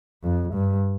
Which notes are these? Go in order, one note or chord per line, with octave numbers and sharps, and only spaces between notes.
F2
G2